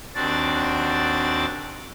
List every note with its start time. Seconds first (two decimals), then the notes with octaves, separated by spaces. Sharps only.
0.15 D#2 C4 D4 F#4 D5 A6